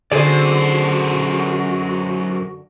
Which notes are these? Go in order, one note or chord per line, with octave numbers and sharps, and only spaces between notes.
F#2 D3 F#4 G#4 C5 D5